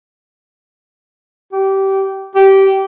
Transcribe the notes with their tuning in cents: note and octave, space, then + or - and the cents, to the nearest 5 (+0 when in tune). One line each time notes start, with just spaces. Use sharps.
G4 -20
G4 -15